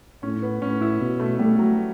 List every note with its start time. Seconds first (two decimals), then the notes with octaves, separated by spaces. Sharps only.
0.23 A2 C#4
0.42 B3
0.62 A2 C#4
0.81 E4
1.01 B2
1.20 A3
1.39 G3 A3
1.59 F#3